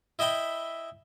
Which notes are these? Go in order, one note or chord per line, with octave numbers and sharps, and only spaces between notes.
E4 D#5 E5 G5 B5